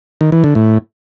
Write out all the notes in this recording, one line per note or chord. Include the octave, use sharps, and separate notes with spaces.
D#3
E3
D3
A2